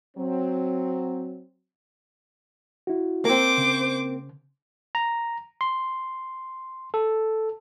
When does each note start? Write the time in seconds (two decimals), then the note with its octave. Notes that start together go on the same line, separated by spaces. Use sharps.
0.17 F#3 C4
2.87 E4 F#4
3.25 A#3 C4 C5 D6
3.58 C#3
4.95 A#5
5.61 C6
6.94 A4